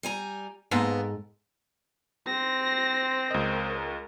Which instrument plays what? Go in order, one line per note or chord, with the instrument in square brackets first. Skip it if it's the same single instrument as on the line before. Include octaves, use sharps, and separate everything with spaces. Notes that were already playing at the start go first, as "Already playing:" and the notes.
[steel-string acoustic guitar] G3 G#5 A#5
[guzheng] G#2 A4 A#5 [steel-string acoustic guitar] A#3 B3 D#5
[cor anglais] C4 [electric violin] C6 A#6
[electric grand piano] C#2 D#5 [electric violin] A#4